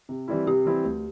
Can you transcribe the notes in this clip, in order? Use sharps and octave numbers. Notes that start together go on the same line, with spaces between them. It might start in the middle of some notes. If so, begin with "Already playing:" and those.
C3
E3 G3 C4 E4
C3 G4
E3 G3 C4 E4
D2